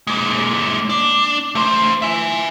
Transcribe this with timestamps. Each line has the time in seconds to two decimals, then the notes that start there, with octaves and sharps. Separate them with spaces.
0.07 G#3 A#3
0.90 D4
1.55 A3 C5
2.02 E5 G#5